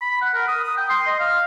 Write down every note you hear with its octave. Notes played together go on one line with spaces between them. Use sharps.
B5
F#5
A#4
D#6
D#6
G5
C6
D#5
F5